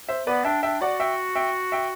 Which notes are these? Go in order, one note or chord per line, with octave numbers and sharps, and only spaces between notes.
C5 E5
B3 B4 D5
D4 E5 G5
D4 E5 G5
F#4 D5 F#5
E5 G5
E5 G5
E5 G5